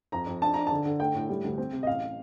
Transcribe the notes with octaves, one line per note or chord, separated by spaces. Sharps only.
F2 A#5
F2
D4 A5
D4 A#5
D3 A5
D3
A3 G5
A2
G3
D2
C4
C3
D#5
A1 F5